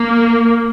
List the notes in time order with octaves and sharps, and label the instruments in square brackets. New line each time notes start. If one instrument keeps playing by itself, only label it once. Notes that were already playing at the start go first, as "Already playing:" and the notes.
Already playing: [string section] A#3